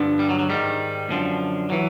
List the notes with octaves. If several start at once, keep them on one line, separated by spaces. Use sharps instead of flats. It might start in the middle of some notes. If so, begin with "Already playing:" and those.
Already playing: G2 D3 F3
G3
F#3
F#3
G#2 D#3 G3
F#2 D3 F3
E3 F#3